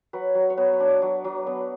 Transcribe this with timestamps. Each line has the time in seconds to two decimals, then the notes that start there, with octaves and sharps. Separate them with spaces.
0.13 F#3 B4
0.35 F#3
0.50 C#5
0.57 B3 B4
0.73 C#5
0.80 D4
0.88 D5
1.02 F#3
1.24 F#3
1.47 B3